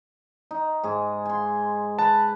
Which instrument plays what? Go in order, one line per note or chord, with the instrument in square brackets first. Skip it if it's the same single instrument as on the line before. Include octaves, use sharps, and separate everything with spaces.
[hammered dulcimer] D#4
G#2 G#4
G#5 C6
[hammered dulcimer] B4 B5 [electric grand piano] A5